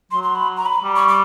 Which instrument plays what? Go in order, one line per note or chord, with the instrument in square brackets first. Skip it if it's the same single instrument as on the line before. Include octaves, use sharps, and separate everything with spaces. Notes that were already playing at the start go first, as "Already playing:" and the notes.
[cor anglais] F#3 [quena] C6
[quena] C6
B5
A#5
B5
[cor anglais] G3
[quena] C#6
D6